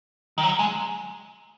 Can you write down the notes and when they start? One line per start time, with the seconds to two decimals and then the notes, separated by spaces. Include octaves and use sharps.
0.38 D#3
0.43 F#3
0.59 G#3